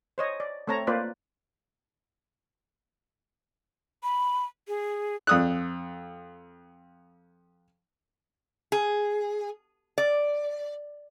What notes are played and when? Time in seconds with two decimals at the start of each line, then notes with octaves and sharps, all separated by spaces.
0.18 C5 C#5 D#5
0.40 D5
0.67 A3 C4 C#5 A5 A#5
0.87 A#3 F4 B4 C5 D5
4.03 B5
4.68 G#4
5.27 F2 D#6 F#6
8.72 G#4
9.98 D5